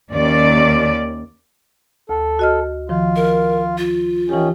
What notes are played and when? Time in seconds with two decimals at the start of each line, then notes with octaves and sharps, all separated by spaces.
0.11 D#2 D#3 C#4 D5
2.09 D2 A4
2.39 F#4 D#5 F6
2.89 D#3 F3 F4
3.16 A#4
3.78 F4
4.29 D#3 E3 C#4 G4